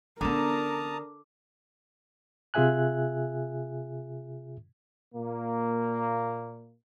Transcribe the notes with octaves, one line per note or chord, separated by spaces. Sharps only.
D3 B3 C#4 D4 A#4 A5 A#5 D#6
C3 F4 G#4 E5 G#5 F#6
A#2 A#3